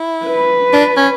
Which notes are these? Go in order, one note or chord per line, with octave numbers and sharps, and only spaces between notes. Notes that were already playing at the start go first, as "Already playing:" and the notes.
Already playing: E4
B4
D4
C#4